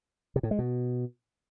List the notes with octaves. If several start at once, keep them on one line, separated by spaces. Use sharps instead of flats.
C3
A2
G#3
B2